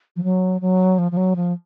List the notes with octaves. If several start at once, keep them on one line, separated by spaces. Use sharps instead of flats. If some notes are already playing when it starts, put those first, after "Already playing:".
F3
F#3
F#3
F3
F3
F#3
F3